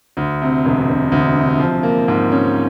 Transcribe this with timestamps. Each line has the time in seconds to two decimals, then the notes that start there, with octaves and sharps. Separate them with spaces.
0.17 D2
0.41 C3
0.65 E1
0.88 E1
1.12 D2
1.36 C3
1.59 F3
1.83 A#3
2.08 G#2
2.32 C#4